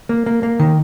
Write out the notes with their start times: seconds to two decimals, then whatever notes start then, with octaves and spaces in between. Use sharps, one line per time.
0.09 A#3
0.26 A#3
0.43 A#3
0.59 D#3